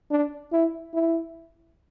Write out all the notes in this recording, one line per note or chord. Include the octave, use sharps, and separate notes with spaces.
D4
E4
E4